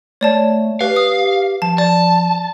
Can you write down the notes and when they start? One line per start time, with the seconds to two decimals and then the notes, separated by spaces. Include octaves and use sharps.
0.21 A3 C#5 D5 A5
0.81 G4 B4 F5
0.96 D#6
1.62 F3 A5
1.78 D5 A5